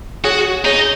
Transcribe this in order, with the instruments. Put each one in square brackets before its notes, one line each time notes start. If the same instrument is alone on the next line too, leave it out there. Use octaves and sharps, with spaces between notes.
[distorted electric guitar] F#4 [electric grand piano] G#4 C#5
[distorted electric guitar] D#4 [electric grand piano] G#4 C#5